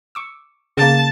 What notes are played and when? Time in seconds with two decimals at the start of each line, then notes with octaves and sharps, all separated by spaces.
0.15 C#6 D6 E6
0.77 C#3 A#3 A5